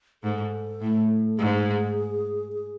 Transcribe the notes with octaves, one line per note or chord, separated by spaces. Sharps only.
G#2 A4
A2
G#2 G#4
G#4